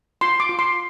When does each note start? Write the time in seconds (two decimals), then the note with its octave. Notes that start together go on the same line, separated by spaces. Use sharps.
0.21 F4 C6
0.40 D6
0.49 F4
0.59 C6